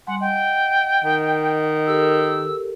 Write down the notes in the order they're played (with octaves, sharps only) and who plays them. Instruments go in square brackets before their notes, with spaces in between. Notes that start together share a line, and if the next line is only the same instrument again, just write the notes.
[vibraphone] G3 G#5 C6 [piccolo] F#5
[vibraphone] D#5 F#5 [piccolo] G5
[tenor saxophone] D#3
[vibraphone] G4 A4 A#4 [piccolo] E6